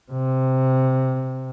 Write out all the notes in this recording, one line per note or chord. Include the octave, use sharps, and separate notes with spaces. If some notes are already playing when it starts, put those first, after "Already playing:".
C3